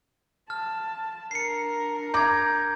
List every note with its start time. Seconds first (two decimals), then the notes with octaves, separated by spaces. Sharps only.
0.50 A5 F6
1.31 D4 A#4 C7 C#7
2.14 A#5 D6 G6 G#6